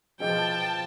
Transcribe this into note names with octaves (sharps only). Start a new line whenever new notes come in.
B2 F3 G#4 D#5 G5 A5